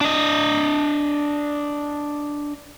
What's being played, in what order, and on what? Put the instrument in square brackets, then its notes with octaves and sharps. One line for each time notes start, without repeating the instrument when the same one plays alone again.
[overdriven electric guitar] D4 D#5